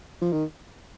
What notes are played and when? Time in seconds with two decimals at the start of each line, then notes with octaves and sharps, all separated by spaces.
0.22 F3
0.33 D#3